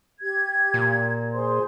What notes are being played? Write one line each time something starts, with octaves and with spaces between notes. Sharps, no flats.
G4 G#6
A#2
G#4 C5 C6